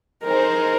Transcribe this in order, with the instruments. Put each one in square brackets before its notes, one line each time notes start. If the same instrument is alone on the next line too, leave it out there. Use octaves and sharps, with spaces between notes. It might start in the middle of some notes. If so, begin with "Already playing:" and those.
[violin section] D#4 G#4 C5 [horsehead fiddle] A#4